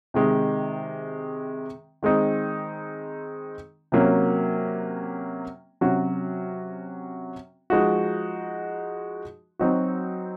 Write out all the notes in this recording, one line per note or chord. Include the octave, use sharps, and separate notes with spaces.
C3 D#3 G#3
D#3 G#3 C4 D#4
C3 F#3 A#3 C#4
C3 F#3 C#4 F#4
F3 G#3 D#4 F#4
F#3 C4 D#4 F#4